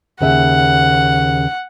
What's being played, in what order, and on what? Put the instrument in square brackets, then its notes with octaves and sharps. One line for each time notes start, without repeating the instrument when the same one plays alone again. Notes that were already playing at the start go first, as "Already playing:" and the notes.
[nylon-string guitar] D#2 C#3 E5 [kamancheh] F#5